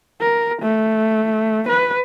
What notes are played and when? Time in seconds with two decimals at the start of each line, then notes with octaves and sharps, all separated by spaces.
0.21 A#4
0.62 A3
1.69 B4